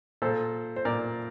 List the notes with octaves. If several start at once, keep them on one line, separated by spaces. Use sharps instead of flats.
A#2 A4 C5
C5
A#2 A#4 D5